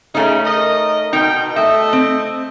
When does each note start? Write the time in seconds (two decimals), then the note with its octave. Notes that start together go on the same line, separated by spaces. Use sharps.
0.15 C#3 A3 C#4 D#4
0.45 A#4 D#5
1.13 B2 D#3 D#4 G5
1.56 A3 A4 D#5 E5
1.93 C4